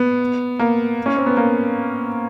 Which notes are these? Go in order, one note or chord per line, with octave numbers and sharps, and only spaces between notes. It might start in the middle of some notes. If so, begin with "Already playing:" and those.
Already playing: B3
A#3
C#4
C4
B3
A#3